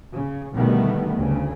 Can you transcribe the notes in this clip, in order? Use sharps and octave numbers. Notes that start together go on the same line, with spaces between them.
C#3
B2 D3 D#3 G3 A3 B3
D2 C#3